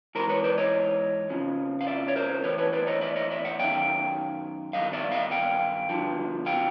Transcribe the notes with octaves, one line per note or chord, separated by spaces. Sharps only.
G#2 E3 A#4 C5
B4 C#5
C5 D5
C#5 D#5
F2 C#3 F3
F5
D5 E5
C#5
A#4 C5
A2 E3 B4 C#5
B4 C#5
C5 D5
C#5 D#5
D5 E5
C#5 D#5
D5 E5
E5 F#5
F#2 D#3 F5 G5
G2 D#3 D#5 F5
D5 E5
D#5 F5
F5 G5
G2 D3 F3
F5 G5